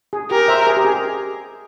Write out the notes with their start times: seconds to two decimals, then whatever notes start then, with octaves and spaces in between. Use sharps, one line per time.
0.13 G#4
0.30 G4 A#4
0.48 C5 E5
0.67 G#4
0.77 G4
0.85 G#4